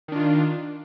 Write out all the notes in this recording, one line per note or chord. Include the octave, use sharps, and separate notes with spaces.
D#3 D4 F4